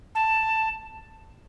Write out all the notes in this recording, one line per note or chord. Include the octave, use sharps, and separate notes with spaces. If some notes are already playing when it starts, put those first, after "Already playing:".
A5